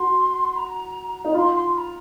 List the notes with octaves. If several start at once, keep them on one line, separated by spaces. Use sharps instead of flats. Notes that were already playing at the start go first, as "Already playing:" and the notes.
Already playing: F#4 C6
A#5
D#4
F4 C6
C6
C6
A#5